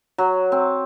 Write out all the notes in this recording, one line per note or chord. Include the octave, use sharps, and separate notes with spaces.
F#3
C4